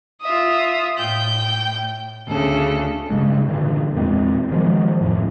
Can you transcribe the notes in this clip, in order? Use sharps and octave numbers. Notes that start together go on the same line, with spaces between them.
F4 E5 D#6
A2 G5 G6
D2 C#3 A4
G2 C#3 G#3
G2 A#2 D3 E3
E2 A#2 G#3 C4
D#3 F3 F#3 G#3
F2 A2